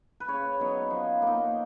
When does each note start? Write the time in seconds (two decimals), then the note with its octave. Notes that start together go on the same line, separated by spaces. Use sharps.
0.20 B4
0.28 C#3 C#5
0.60 F#3 B3 D#4
0.90 F3
1.22 A#3 D#4